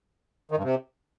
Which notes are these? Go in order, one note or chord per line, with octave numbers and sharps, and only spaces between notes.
D#3
G2
C3